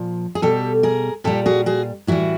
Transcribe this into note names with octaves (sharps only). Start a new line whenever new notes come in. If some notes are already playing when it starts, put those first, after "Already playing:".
Already playing: A#2 F3
G#4
B2 G3 G4 A4
G#4 A#4
A#2 G3 G4 A4
F#4 G#4
F#4 G#4
A2 E3 G3 E4 F#4